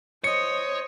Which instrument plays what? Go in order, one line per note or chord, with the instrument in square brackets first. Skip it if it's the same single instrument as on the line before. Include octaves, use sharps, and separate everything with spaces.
[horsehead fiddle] C5 D#5 [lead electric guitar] C#5 [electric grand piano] C#7